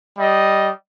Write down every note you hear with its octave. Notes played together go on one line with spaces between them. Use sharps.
G3 D#5